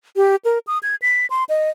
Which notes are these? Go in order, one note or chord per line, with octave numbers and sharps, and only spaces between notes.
G4
A#4
D#6
G#6
B6
C6
D#5